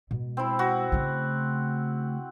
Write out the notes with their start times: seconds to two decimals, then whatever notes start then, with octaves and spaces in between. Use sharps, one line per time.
0.11 B2 G#3
0.37 C4 E4
0.59 F#4
0.92 C#3 A3